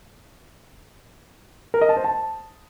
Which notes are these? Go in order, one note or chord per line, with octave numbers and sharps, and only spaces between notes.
A#4
D#5
A5
C5
A5